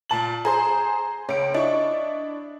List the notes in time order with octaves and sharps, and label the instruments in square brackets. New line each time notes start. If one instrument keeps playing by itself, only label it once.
[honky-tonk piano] A#2 A5 F#7
[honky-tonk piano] G#4 C5 C6 [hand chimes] A#5
[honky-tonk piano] C#2 D7 [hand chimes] C#5
[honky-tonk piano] D4 E4 C#6 [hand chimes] D#5